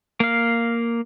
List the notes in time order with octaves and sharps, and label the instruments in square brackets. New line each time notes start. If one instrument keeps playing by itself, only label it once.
[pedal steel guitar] A#3 F5